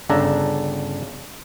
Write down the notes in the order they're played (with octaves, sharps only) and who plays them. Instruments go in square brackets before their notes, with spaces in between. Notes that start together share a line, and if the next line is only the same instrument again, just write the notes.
[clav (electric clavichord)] G1 C#3 D4 A4 A#5